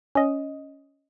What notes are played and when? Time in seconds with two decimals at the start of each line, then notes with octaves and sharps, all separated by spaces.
0.15 C#4 D#5